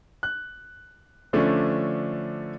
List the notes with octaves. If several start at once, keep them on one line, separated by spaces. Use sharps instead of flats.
F#6
D3 F3 A3 C#4 D4